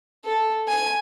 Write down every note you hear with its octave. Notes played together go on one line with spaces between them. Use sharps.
A4
G#5